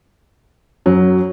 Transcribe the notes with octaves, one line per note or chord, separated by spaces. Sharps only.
F#2 F#3